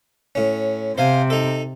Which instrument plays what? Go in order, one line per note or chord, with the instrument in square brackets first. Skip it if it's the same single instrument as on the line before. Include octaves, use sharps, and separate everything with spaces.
[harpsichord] A2 C#4
[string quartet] C3 [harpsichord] C5 F5 G#5
[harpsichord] D#4 A4